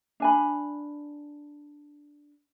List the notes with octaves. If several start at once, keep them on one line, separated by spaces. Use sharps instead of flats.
D4 G#5 B5